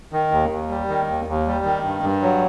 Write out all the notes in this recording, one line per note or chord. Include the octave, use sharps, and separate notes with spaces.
D#3
D#2
D#2
G3
D#3
D#2
D#2
G3
D#3
G2
G2
F#3